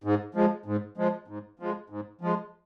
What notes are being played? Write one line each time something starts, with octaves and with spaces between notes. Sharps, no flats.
G#2
F3 G#3
G#2
F3 G#3
G#2
F3 G#3
G#2
F3 G#3